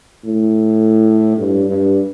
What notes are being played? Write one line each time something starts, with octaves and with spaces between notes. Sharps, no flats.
A2
G2
G2